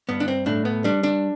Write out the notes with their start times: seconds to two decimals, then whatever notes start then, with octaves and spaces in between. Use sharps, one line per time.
0.09 G2 B3
0.20 D4
0.28 C4
0.46 A2 D4
0.65 B3
0.84 G3 D4
1.03 D4